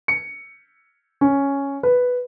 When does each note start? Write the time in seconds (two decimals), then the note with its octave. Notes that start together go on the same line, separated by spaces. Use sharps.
0.08 C#7
1.21 C#4
1.83 B4